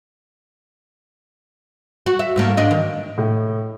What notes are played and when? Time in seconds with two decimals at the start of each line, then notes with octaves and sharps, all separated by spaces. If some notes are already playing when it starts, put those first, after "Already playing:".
2.06 F#4
2.19 E5
2.36 G#2 A3 A#3
2.57 G#2 D4 D#5
2.71 D#3
3.18 A2